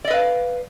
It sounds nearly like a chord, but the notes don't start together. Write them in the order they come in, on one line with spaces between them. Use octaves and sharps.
D5 D#5 B4 F5